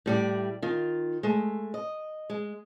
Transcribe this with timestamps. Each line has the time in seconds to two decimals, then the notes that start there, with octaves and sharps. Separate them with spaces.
0.06 A2 G3 D5
0.62 D#3 F4
1.23 G#3 A3
1.74 D#5
2.30 G#3